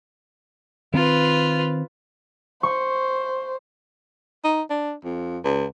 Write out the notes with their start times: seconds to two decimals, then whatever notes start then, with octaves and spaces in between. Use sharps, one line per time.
0.94 D#3 C4 F4 B4
2.63 C5 C#6
4.44 D#4
4.70 D4
5.04 F2
5.44 C#2